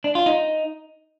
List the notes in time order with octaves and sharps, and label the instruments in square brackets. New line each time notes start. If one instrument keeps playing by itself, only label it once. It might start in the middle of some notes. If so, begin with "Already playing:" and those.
[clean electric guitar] D4
F4
D#4